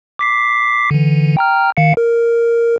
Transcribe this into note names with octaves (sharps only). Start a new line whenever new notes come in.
D6 B6 C7
D3 E3
G5 A#5 F6
D#3 F5 C#7
A#4